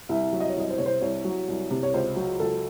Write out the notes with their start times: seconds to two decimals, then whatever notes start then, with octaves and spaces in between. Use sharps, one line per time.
0.09 C2 E5
0.33 F#3
0.40 D#5
0.50 C#5
0.56 C2 D#5
0.70 C5
0.78 C3 C#5
0.86 C5
1.01 C2 C#5
1.24 F#3
1.48 C2
1.71 C3
1.83 C#5
1.94 C#2 C5
2.16 F#3
2.40 C#2 A4